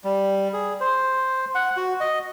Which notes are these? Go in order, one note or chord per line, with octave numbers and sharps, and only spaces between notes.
G3
G#4
C5
F#5
F#4
D#5